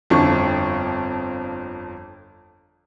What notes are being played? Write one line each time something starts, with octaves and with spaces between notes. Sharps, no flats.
G1 F2 F3 D4 C#6